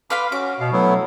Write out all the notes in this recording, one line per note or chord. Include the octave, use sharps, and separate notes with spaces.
B4 F5 B5 C6 D6
C#4 F#4 D6
B2 F5
F#3 A3 B3 E4